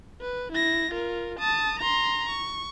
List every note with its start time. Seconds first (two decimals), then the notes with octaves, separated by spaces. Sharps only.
0.21 B4
0.52 E4 A#6
0.91 F4 A#4
1.39 A5 D#6
1.80 A#5 C6
2.29 C#6